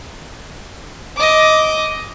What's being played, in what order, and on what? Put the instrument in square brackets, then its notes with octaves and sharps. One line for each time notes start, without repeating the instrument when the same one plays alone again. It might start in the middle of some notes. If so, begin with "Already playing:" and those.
[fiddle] D#5 D6